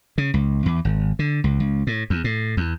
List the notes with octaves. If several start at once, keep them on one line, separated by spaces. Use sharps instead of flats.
C#3
C#2
E2
G#1
D3
C#2
C#2
A2
E2
A2
E2